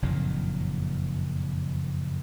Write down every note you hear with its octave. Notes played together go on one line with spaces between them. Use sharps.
F#1 F2 A#2 D#3